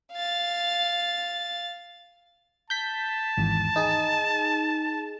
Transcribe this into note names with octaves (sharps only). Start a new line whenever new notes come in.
F5 A6
A5 G6 B6
G#1 E2
D#4 G#4